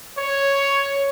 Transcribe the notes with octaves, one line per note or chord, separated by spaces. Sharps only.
C#5